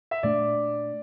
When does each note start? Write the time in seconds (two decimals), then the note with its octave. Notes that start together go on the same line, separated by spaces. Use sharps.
0.11 E5
0.23 A#2 A3 D4 D5